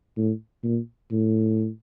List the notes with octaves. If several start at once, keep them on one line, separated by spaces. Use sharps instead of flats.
A2
A#2
A2